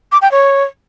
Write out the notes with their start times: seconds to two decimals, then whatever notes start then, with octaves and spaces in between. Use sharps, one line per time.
0.12 D6
0.22 G5
0.32 C#5